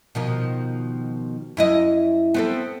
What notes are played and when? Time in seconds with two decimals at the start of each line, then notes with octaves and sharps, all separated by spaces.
0.15 B2 D#3 F3
1.57 F#2 E4 D#5
2.34 B3 C4 A4